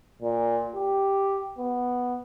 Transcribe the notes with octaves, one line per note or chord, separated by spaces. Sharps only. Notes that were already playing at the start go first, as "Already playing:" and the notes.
A#2
G4
B3